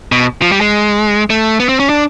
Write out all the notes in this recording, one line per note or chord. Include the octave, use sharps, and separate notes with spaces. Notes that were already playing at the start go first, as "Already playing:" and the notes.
B2
F3
G3
G#3
A3
B3
C4
C#4
D4